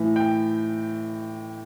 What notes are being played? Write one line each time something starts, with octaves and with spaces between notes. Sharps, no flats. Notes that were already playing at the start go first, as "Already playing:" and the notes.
Already playing: A2 E3
G5